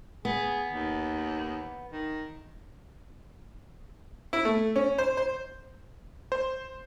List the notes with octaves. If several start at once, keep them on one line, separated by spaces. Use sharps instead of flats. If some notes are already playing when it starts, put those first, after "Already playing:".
B3 G#4
D#2
D#3
E4
A3
C#4
C5
C5
C5